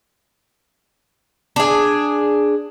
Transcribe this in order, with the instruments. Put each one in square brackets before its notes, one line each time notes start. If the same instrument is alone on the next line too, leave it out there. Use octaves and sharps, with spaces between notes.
[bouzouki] D4 G#4